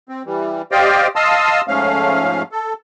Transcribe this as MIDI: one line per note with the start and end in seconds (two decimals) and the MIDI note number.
0.09 0.23 60
0.26 0.62 52
0.26 0.62 55
0.72 1.07 67
0.72 1.07 72
0.72 1.07 74
0.72 1.07 75
0.72 1.07 77
0.72 1.07 79
1.16 1.61 75
1.16 1.61 77
1.16 1.61 81
1.16 1.61 84
1.16 1.61 87
1.16 1.61 88
1.68 2.42 44
1.68 2.42 53
1.68 2.42 57
1.68 2.42 61
1.68 2.42 77
2.52 2.73 69